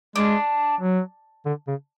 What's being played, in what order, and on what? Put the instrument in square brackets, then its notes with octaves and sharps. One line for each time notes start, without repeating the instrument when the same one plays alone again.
[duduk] G#3 [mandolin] D4
[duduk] F#3
D3
C#3